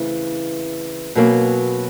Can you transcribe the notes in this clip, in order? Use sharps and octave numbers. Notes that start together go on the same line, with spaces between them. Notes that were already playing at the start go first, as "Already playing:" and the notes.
Already playing: C#3 E3 A3 C4
B2 F#3 A#3 C#4